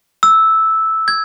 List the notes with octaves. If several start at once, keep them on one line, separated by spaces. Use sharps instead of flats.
E6
G#6